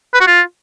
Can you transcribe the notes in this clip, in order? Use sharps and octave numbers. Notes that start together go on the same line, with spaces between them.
B4
F#4
F4